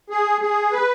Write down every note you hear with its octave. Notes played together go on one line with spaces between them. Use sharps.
G#4
G#4
B4